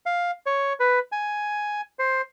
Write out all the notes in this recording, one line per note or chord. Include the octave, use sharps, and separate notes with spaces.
F5
C#5
B4
G#5
C5